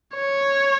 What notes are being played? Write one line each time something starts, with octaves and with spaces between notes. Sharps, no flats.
C#5